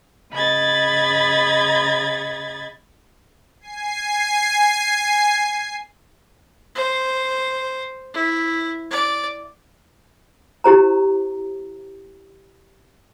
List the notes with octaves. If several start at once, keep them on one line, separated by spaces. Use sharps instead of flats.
C#3 D#5 B5 G#6 A6
G#5 C7
C5
E4
D5
E4 G4 C5 A#5